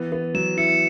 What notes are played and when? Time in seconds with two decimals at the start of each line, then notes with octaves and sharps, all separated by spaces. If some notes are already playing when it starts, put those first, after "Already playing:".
Already playing: E3 B3
0.12 B3
0.34 F#3 E7
0.57 E4 C#7